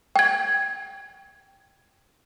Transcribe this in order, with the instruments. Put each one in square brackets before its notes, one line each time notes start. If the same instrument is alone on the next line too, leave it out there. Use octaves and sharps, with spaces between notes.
[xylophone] G5 G#6